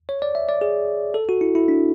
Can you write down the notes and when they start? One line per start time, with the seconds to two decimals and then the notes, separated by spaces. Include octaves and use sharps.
0.09 C#5
0.22 D5
0.35 E5
0.49 D5
0.61 G#4
1.14 A4
1.29 F#4
1.41 E4
1.55 E4
1.68 D4